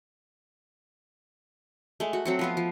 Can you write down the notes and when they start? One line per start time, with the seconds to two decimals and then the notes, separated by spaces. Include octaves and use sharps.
2.00 G#3 A3
2.13 F#4
2.25 F#3 C4 F#4
2.39 F3 B3 F4
2.57 F3